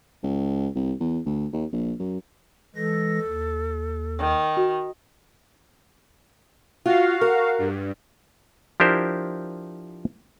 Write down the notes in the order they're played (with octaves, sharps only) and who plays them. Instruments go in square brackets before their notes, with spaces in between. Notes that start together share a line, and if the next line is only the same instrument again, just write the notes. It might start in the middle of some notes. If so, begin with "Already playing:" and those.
[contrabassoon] C#2
C2
E2
D2
D#2
A#1
F#2
[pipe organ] E3 G#3 A#6 [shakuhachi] A4
[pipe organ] D#2
[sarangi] D#3
[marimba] F#4
[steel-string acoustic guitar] F4 [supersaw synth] F#4 F5
[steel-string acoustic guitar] A#4
[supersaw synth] G2
[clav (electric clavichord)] F3 D4 E4 G4 A#4 C5